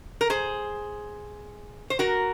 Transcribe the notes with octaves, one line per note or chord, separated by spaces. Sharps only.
A#4
G#4 C5
C5
F#4 A#4